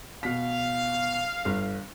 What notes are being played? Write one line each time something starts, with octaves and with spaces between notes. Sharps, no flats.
B2 F5 B6
G1